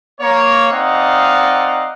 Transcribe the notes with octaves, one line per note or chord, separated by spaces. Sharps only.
A#3 C#5
C4 D#4 D5 D#5 F5 F#5